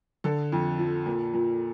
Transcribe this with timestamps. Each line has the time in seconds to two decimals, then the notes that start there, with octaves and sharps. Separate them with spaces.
0.24 D3 A4
0.52 F2
0.79 F3
1.06 A#2
1.34 A#2